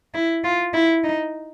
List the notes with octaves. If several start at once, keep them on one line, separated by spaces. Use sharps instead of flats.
E4
F4
E4
D#4